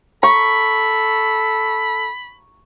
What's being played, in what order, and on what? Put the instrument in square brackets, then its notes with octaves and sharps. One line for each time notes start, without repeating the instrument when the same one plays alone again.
[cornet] A4 [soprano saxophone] B5 [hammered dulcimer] C#6